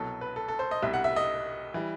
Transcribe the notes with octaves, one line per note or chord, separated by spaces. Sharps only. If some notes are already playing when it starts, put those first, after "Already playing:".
Already playing: C2 B2 F#3 A4
B4
A4
A4
C5
D#5
C2 B2 G3 E5
F#5
E5
D#5
E3 G3